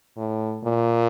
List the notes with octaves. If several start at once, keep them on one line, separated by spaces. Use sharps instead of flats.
A2
A#2